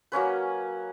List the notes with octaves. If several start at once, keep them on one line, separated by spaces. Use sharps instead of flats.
F#3 A#3 C#4 B4